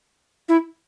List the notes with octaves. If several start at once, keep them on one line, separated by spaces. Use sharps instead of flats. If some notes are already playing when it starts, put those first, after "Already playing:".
E4